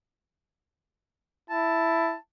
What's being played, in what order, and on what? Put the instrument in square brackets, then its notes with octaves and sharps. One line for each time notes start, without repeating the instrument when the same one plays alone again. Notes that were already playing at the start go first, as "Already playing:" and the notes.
[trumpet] E4 [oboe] A5